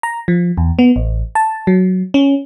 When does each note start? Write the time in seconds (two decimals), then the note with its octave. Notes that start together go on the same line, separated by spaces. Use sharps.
0.03 A#5
0.28 F3
0.58 E2
0.79 B3
0.96 A1
1.35 A5
1.67 F#3
2.14 C#4